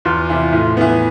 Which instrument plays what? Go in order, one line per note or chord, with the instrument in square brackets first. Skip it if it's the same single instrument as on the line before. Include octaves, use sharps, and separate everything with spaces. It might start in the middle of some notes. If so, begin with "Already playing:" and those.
[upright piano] E2 [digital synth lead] F4
[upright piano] C3 E3
A2
E3 B3